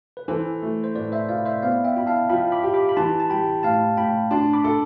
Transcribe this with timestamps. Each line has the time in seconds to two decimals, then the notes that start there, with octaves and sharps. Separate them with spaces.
0.17 B4
0.28 E3 A4 C5
0.62 A3
0.84 C5
0.95 A2 B4 D5
1.12 C5 E5
1.29 E4 D5 F5
1.45 C5 E5
1.62 B3 D5 F5
1.84 E5 G5
1.96 E4 B5
2.07 F5 A5
2.29 F3 G5 B5
2.52 B5 D6
2.63 G4
2.74 B5 D6
2.89 B5
2.97 E3 A5 C6
3.20 A5
3.30 G3 G5 B5
3.63 A2 F5 A5
3.97 A2 G5 B5
4.31 D4 A5 C6
4.53 B5 D6
4.64 A4